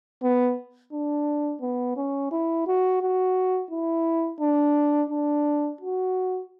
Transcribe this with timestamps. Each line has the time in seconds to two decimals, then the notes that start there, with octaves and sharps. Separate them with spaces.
0.23 B3
0.92 D4
1.61 B3
1.97 C#4
2.32 E4
2.67 F#4
3.01 F#4
3.71 E4
4.40 D4
5.10 D4
5.81 F#4